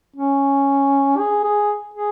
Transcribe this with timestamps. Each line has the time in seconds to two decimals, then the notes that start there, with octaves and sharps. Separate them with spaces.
0.16 C#4
1.19 G#4
1.44 G#4
1.94 G#4